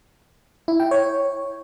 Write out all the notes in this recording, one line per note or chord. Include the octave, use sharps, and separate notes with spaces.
E4
G5
C#5